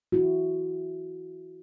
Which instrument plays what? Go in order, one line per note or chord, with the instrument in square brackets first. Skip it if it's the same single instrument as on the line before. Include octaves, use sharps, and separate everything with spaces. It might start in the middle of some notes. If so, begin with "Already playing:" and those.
[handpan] E4 F#4